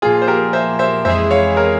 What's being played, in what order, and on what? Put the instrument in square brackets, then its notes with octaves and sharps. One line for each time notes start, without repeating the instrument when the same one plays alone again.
[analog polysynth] A#2 F3 A#3 [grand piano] F4 G#4
[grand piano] C5
G4 A#4
C5 E5
C5 E5
[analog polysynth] F2 E3 G#3 E4 G#4 [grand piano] C5 E5
[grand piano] C#5 F5
A#4 C#5